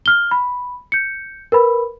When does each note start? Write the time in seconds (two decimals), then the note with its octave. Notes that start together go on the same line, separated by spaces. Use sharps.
0.06 F6 G7
0.31 B5
0.92 G6 C#7
1.52 A#4 B4 B5